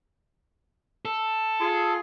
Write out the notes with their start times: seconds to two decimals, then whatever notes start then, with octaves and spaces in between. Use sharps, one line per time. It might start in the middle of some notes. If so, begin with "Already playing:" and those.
1.05 A4
1.60 F4 G#4